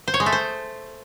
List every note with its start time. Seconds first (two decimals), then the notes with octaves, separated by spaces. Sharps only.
0.08 C5
0.14 C#5
0.20 G#3
0.26 A3
0.32 C5